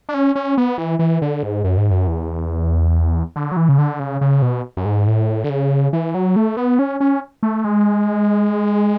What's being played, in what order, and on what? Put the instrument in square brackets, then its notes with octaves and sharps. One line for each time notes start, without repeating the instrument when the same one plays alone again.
[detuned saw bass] D4
C#4
C#4
B3
E3
E3
D3
G#2
F#2
G#2
F#2
E2
D3
F#3
E3
C#3
D3
C#3
C#3
B2
F#2
G#2
A2
D3
C#3
E3
F#3
A3
B3
C#4
C#4
A3
G#3